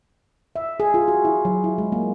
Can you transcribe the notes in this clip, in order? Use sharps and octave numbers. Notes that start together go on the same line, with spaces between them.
E5
G#4
F4
F#4
E4
F#3
E4
G#3
A#3